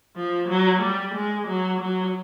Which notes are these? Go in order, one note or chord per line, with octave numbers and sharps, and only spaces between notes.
F3
F#3
G3
G#3
F#3
F#3